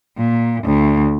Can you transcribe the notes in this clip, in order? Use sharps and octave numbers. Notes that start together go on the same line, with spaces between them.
A#2
D2